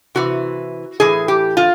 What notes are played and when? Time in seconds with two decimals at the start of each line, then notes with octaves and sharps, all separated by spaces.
0.15 C3 E3 F#4
1.00 A2 E3 G#4
1.28 G4
1.57 F4